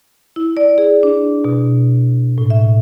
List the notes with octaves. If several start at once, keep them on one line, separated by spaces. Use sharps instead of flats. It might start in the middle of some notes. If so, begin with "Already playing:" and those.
E4
D5
G#4
D4
B2
A2
E5